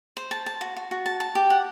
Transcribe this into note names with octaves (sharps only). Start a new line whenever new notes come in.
C5
A5
A5
F#4
F#4
F#4
A5
A5
G4
F#5